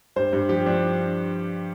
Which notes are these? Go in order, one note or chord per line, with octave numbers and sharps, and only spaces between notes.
G2 C5
G2
F3 G4
F3 D4